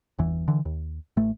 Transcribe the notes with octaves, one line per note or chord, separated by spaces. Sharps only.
G1 E2 E3
D3 E3
D#2
A1 A3